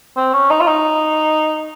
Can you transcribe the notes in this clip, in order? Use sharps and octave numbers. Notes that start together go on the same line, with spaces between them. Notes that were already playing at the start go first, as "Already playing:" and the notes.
C4
C#4
D#4
F4
D#4